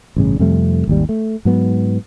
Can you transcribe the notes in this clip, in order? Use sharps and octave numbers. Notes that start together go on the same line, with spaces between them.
A1 G2 C#3
F2 C3 G3 A3
G#1 D#2 G3
A3
G#2 F#3 B3